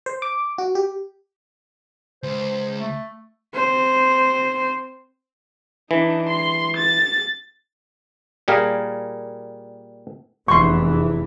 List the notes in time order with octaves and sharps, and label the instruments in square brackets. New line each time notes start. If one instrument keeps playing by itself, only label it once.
[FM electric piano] C5
D6
F#4
G4
[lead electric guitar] C#2 [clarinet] C5
[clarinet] A3
[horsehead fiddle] C4 C5
[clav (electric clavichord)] E3 [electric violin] D4 D#4
[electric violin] C6
A6
[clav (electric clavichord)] A#2 G3 G#4 A#4 F5
[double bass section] F1 E2 E3 [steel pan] C6 C#6